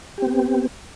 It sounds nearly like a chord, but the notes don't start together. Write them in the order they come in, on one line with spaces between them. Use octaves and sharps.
G4 C4 B3